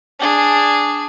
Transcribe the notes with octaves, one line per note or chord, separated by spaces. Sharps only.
D4 G#4